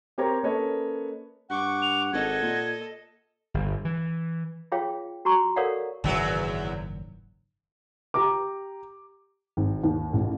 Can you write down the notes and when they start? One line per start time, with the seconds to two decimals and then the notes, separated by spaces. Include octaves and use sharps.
0.18 C4 G4 A#4 C#5 A#5
0.43 A#3 C#4 A4 B4 C#5 D#5
1.50 G2 F#5 C#6 D6
1.82 F7
2.13 G#1 A4 D#5 G#6
2.42 A#2
3.54 G1
3.85 E3
4.72 F4 G#4 C#5 F5 G5
5.25 F#4 A#5 C#6
5.56 A4 A#4 C#5 D5 F5 F#5
6.04 F#1 E2 G#2 D#3 F#3
8.14 G4 A#5 D6
9.57 G#1
9.83 D#2
10.13 A1